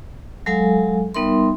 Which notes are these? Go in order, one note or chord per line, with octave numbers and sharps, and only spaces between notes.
F#3 G#3 A4 F5 G#5
G3 B3 D#4 A#4 E5 C6